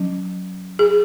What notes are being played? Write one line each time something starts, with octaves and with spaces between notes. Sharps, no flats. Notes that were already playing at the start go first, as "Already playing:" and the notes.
Already playing: F#3 C#4
G#4